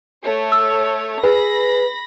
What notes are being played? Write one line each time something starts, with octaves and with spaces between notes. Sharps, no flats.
A3 C#5
E6
G#4 B4 B5 A#6